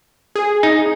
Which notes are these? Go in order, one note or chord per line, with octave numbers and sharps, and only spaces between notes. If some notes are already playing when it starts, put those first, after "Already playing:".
G#4
D#4